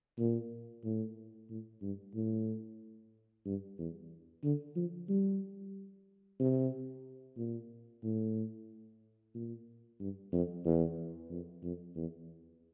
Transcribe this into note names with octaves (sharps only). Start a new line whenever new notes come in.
A#2
A2
A2
G2
A2
G2
E2
D3
F3
G3
C3
A#2
A2
A#2
G2
F2
E2
F2
F2
E2